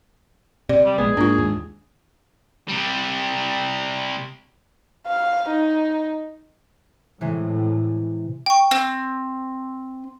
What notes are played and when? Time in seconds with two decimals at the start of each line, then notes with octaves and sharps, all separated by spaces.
0.69 C3 D5
0.85 G3
0.98 A#1 G#3 B3 G#4
1.17 G#2 A#3 D4 F4
1.38 D#2 G#2
2.69 C3 G3
5.07 F5
5.48 D#4
7.21 A2 C3 E3 G#3
8.46 G5 C#6
8.71 C4